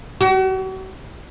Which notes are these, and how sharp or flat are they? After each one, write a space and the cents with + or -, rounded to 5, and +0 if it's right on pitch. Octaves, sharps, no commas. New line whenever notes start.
F#4 +40